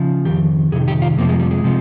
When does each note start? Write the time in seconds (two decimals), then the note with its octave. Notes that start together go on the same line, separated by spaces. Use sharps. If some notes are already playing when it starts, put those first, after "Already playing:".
Already playing: C#3 F3
0.25 F2 C3 D#3 G4
0.72 F2 C3 D#3 G#4
0.88 G4
1.02 F4
1.17 F2 C3 F3 A#3
1.29 G#3
1.40 G3
1.51 G#3
1.64 C3 F3